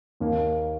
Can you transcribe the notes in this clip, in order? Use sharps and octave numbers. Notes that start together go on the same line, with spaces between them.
D#2 D#3 A#3